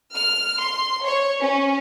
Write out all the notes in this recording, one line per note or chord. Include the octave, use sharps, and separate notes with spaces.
F6
C6
C#5
C#4